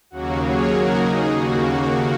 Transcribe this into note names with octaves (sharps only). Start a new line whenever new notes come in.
D#2 C#3 F#3 A#3 F#4
G#4 C#5
F#4 A#4
D#4 G#4
D#2 C#3 A#3 F#4